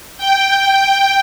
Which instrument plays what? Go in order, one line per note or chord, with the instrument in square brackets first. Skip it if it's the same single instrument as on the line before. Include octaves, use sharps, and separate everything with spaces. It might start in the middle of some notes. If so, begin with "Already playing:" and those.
[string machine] G5